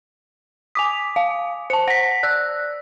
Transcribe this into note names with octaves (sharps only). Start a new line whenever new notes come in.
G#5 D6 D#6 B6 F7
F5
C5 A5 C#7
F#5 A#6 B6
D5 E6 F#6